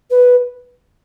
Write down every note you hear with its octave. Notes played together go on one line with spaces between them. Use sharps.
B4